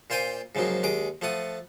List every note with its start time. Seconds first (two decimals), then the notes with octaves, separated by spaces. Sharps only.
0.10 A#2 F4 C5 G5 G#5 D6
0.55 G#2 C#3 F3 F#3 A#3
0.83 D#2 G#3 G#4 D6
1.22 F3 A3 F#5 D#6